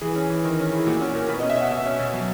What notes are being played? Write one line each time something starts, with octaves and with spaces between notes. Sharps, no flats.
E3 G#4
C#4
E3
D#3 A#4
C#4
E4 G#4
A#2 F#4
C#4 F#4
A#2 A#4
B2 B4
D#5
C#4
E5
B2 F#5
B2 E5
C#4
B2
F#3